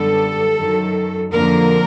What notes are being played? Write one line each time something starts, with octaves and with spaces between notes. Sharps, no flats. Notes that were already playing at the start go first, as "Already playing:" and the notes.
Already playing: F#2 D3 G3 B3 A4
F#2 D#3 F#3
F2 D3 F3 A#3 A#4